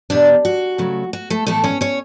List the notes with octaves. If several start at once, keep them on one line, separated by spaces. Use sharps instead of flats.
E2 B2 G3 B3 D4 D5
F#4
C#3 F#3 A3
F#4
A3 A4
A2 E3 A3 B3 E4 A4
C#4 C#5
C#4 C#5